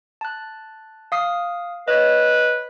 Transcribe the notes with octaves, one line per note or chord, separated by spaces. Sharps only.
A5 F#6
F5 D#6 C7
B4 C#5 D#5